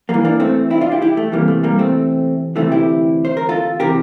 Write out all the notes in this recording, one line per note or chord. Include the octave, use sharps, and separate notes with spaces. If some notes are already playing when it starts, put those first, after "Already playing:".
E2 E3 G3 A#3
A#3 D4
A3 C4
C4 E4
D4 F4
E4 G4
E4 G4
A3
E2 C3 E3 G3 A#3
A3
G3 A#3
A3 C4
D2 C3 E3 A3 C4
E4 G4
C5
A#4
F4 A4
C3 E3 G4 A#4